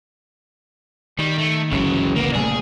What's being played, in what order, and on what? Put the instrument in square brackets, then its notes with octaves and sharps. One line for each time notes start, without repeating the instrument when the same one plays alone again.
[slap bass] D#3 [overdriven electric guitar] G3
[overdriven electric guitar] A3
[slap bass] G1 C#2 E3 [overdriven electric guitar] C#3 F#3
[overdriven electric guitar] A#3 B3
[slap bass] A#2 G3 A3 [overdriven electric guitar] G#4